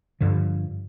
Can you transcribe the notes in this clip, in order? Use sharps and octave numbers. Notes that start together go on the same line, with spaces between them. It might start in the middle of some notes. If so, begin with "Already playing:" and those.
G2 D3 F3